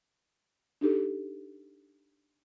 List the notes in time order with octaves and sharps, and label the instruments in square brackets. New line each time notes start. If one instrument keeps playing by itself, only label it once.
[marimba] D4 D#4 G4 A4